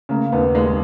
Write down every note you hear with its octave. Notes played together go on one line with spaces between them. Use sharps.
C#3 A#3
D#2 B3
D#2 G#3